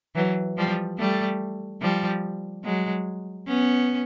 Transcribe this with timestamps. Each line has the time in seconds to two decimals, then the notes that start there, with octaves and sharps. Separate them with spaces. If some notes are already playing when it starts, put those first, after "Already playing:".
0.15 E3 F#3
0.57 F3 G3
0.98 G3 A3
1.81 F3 G3
2.64 F#3 G#3
3.47 B3 C#4